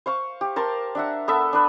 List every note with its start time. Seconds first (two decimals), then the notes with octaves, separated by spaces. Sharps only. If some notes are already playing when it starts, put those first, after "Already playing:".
0.06 C5 F5 C#6
0.41 G4
0.56 A#4 A5 C6
0.95 D4 E5 F#5
1.28 B3 A4 E5
1.53 D4 B4